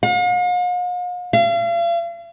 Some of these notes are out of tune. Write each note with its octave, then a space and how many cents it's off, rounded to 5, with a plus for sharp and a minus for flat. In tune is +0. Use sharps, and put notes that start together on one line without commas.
F5 +45
F5 -40